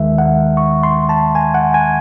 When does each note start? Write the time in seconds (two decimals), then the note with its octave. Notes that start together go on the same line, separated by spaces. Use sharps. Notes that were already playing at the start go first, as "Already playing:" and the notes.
Already playing: D#2 D#3 G#3 E5
0.18 F#5
0.57 C#6
0.83 C6
1.09 A5
1.35 G#5
1.54 F#5
1.74 G#5